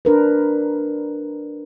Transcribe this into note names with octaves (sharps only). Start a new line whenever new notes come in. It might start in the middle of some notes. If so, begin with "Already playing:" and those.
D4 A#4 B4